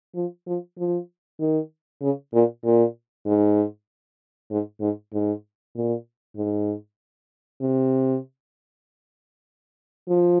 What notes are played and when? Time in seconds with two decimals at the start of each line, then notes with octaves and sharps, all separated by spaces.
0.15 F3
0.47 F3
0.78 F3
1.40 D#3
2.01 C#3
2.33 A#2
2.65 A#2
3.26 G#2
4.50 G#2
4.81 G#2
5.13 G#2
5.75 A#2
6.36 G#2
7.61 C3
10.09 F3